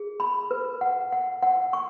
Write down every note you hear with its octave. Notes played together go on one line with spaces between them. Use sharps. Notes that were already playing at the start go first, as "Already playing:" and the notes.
Already playing: G#4
B5
B4
F#5
F#5
F#5
C#6